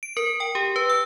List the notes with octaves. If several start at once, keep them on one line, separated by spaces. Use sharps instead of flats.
D7
A#4
G5
G4
B4
E6